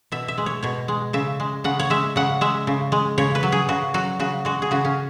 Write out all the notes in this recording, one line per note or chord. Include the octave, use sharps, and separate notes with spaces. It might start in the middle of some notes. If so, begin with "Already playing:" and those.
B2 E5
E5
G#3
C#5
B2 C#5
G#3
C#3 E5
G#3
C#3 F#5
C#5
G#3 E5
C#3 F#5
G#3 E5
C#3
G#3
C#3 C#5
B4
F#3
G#4
C#3 F#4
F#3 F#4
C#3 F#4
G#3 F#4
G#4
C#3 F#4
C#4